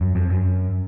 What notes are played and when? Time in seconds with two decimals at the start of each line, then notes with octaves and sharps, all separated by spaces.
0.01 F#2
0.15 F2
0.30 F#2